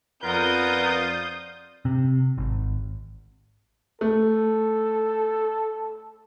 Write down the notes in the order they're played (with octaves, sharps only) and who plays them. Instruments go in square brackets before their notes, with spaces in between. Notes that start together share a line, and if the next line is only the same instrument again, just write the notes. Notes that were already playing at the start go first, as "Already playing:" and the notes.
[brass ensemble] F2 D5 [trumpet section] B3 A#4 B4 [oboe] F4 [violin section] D#6 G6
[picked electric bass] C3
G#1
[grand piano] A3 [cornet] A4